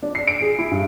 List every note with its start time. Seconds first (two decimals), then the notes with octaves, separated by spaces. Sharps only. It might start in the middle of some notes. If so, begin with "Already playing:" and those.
0.03 D4
0.15 C7
0.27 D7
0.41 G#4
0.59 E4
0.71 G2